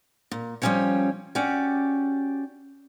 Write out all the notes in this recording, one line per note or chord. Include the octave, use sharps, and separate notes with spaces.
A#2
F3 G3 C4 C#4 C5 C#5
C#4 F#4 G4 D5